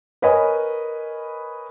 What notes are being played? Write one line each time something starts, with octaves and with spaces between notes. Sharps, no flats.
A#4 B4 C#5 D#5 G#5 B5